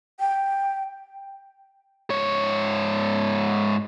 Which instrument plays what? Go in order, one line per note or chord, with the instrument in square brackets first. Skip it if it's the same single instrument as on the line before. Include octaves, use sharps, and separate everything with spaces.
[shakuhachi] G5
[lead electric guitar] G#2 C#5